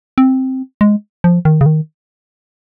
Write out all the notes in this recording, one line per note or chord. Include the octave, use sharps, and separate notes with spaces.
C4
G#3
F3
D#3
C#3
D#3